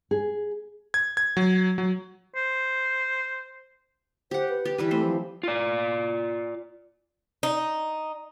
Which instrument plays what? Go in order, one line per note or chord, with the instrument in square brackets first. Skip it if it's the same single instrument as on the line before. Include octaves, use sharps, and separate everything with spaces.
[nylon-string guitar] G#4
[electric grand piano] G#6
G#6
F#3
F#3
[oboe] C5
[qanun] G4 F#5 [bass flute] C5
[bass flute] B4
[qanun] G4
E3 G3 B4
[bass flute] A3 [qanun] C4 C5
[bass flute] F3
[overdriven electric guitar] F4 D5
[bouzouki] D#4